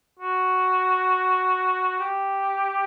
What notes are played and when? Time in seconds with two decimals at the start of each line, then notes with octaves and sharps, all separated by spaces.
0.19 F#4
2.00 G4